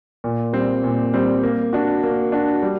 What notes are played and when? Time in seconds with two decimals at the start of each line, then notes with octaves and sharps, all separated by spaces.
0.24 A#2
0.53 G3 C4
0.84 A#2
1.14 G3 C4
1.43 A#3
1.73 D4 F#4
2.03 A#3
2.32 D4 F#4
2.63 G3